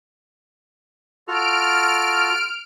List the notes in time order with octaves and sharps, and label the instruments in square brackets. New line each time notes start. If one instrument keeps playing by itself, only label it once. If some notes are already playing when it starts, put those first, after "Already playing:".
[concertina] F4 F#4 A4 [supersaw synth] F6 D7